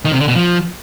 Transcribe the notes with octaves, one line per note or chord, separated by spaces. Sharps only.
D#3
C3
D3
B2
F3